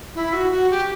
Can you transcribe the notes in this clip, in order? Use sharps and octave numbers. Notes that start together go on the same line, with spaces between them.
E4
F#4
F#4
G4